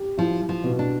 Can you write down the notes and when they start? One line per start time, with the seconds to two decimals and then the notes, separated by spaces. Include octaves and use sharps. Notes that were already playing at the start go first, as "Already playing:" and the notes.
Already playing: G4
0.18 F3 E4
0.49 F3
0.64 B2
0.79 D4